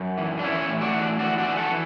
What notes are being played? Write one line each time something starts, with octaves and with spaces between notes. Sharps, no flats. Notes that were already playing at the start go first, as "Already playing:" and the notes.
Already playing: F#2
E3
D4
E3 C#4 E4
A2
D4 F#4
E3
E3 D4 F#4
D4 F#4
E3
F#4 A4
E3